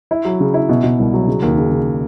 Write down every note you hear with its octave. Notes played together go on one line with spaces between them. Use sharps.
E4
F#3
C#3
E4
B2
B2
C2
F#3
C#3
D#2
C#3
C#3